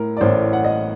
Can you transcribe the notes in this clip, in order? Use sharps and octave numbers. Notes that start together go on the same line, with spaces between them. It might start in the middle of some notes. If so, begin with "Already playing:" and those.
Already playing: A2 A#4
D5
A1 A2 C5
F#5
D#5